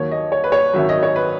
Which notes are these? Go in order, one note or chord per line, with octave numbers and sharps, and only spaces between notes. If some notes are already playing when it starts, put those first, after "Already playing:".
Already playing: D#2 D#3 F#3 C#5
D#5
C#5
B4
C#5
G#1 F#2 D#3 F#3 E5
D#5
C#5
B4